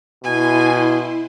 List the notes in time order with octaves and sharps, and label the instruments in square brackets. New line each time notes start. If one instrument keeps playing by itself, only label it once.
[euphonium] B2 [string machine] E4 C6 [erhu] G#5